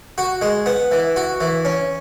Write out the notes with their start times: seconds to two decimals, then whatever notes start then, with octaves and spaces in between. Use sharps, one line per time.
0.18 F#4
0.41 G#3
0.66 B3
0.92 E3
1.16 F#4
1.41 E3
1.65 C#4